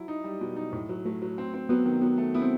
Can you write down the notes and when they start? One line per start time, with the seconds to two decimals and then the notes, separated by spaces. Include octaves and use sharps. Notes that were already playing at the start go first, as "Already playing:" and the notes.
Already playing: F#3 E4
0.08 D#4
0.24 G3
0.41 B2
0.56 D#4
0.72 A2
0.89 F#3
1.05 F#3 A3
1.22 F#3
1.38 C4
1.54 C4
1.69 F#3 B3
1.86 D#3
2.02 F#3 B3
2.18 A3
2.34 B3 E4
2.42 C4